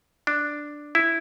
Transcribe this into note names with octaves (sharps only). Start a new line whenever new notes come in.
D4
E4